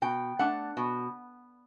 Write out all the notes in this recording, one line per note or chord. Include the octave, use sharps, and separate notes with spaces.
B2 G5
A3 D4 F#5
B2